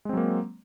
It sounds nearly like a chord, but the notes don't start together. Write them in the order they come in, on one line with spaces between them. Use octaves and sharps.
G#3 C4 F#3 A#3